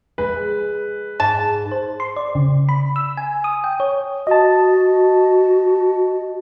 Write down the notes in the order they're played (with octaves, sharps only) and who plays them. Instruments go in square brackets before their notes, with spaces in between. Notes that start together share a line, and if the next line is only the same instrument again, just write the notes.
[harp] G#3 [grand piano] B4
[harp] G#2 [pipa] A5
[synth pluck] C5
C6
D5
C#3
B5
E6
G#5
D#6
G5
C#5
[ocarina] F#4 [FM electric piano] D#5 A5